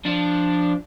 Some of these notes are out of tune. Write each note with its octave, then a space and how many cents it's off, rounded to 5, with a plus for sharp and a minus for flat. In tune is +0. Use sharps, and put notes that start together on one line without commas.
F3 +0 D4 +0